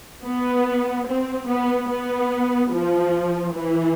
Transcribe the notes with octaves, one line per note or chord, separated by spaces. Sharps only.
B3
C4
B3
B3
F3
E3